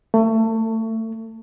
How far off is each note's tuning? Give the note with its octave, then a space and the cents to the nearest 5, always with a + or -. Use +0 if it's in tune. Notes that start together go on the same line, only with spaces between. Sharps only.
A3 +25